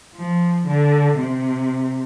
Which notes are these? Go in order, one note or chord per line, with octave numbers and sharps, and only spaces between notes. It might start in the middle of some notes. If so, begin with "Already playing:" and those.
F3
D3
C3